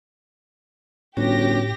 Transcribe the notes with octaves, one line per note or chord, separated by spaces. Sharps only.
G1 A2 C#4 F#4 G4 C#5 A#6